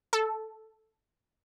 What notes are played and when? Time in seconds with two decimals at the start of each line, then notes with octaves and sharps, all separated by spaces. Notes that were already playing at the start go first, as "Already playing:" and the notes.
0.13 A4